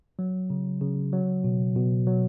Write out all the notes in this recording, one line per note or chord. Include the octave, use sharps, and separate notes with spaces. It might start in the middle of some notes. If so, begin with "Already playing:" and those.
F#3
C#3
C#3
F#3
B2
B2
F#3